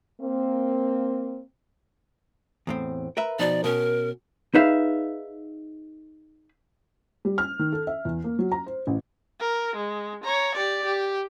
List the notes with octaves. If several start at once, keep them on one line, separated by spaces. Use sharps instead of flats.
A#3 C4
E2 A2 C4
A#4 B4 E5
B2 F3 D#4 D5
B2 C#4 A#4
D#4 G#4 B4 E5 F5
G3
F6
D#3
A4
E5
E2
A#3
F#3
A#5
C5
A1
A#4
G#3
C#5 A#5
G4 D5
G4